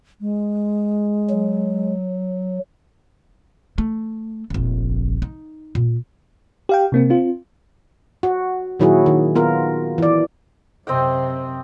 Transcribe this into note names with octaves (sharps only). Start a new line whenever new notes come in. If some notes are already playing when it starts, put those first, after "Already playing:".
G#3
F#3
A3
F1 A#1
D#4
A#2
G4 F5 G5
C3 A#3 C4
C4 F4
F#4
A#2 D#3 F#3 E4 F#4 G#4
D#3
B3 F4 A#4
E3 D5
F#2 C3 C4 D#5 G5